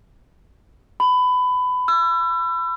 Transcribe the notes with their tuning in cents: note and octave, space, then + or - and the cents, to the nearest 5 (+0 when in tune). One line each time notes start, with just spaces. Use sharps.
B5 +20
E6 +35